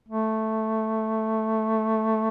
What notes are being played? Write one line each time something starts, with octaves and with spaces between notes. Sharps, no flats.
A3